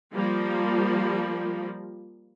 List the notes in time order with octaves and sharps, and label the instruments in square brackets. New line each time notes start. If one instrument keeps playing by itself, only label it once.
[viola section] F3 G3 A#3